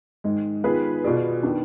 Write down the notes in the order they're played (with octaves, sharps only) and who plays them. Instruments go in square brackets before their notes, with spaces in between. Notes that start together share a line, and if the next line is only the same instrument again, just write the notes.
[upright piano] G#2 D#3 G#3
D#3 B3 F4 G#4 B4
B2 B3 F4 G#4 D5
D#3 B3 D4